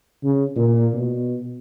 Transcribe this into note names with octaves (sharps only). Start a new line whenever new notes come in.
C#3
A#2
B2